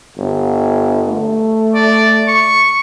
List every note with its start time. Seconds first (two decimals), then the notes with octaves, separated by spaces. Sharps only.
0.18 G1
1.07 A3
1.75 D5
2.28 C#6